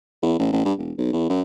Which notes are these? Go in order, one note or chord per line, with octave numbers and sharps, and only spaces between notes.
E2
A1
A1
G2
E1
B1
E2
F#2